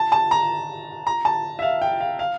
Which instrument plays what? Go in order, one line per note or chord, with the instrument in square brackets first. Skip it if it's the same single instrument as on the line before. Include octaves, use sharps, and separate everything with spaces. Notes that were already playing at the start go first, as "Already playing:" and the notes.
Already playing: [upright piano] A5
A5
A#5
A#5
A5
E5
F5
G5
F5
F5